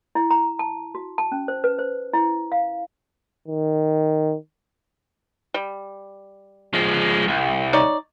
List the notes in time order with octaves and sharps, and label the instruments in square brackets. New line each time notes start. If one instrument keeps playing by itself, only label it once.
[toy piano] E4
A#5
A5
F#4
A5
C#4
C5
B4
C5
E4
F5
[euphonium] D#3
[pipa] G3
[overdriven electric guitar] F3 G#3
C2
[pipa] D#4 C#5 D5